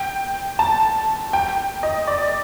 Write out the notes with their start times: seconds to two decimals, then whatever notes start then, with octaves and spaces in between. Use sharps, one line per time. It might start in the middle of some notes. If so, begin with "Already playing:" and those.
Already playing: G5
0.59 A5
1.33 G5
1.83 D#5
2.07 D5